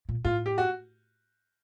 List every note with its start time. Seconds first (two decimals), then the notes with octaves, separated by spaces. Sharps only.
0.09 A#2
0.25 A2 F4
0.46 G4
0.58 F#4